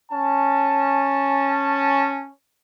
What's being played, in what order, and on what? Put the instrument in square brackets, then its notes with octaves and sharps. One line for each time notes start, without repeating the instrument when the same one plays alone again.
[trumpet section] C#4 A5